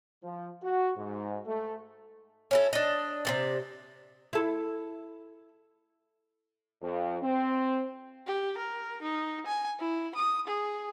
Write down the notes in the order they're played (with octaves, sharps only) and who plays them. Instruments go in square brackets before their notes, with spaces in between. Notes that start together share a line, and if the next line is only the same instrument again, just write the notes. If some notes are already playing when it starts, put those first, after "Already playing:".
[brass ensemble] F3
F#4
G#2
A3
[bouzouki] C#4 E4 A4
D4 D#5
C3 G#3 D5
[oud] E4 A4
[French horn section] F2
C4
[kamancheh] G4
A#4
D#4
G#5
E4
D#6
G#4